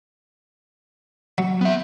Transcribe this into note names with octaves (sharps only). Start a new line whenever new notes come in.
F#3
B3 E5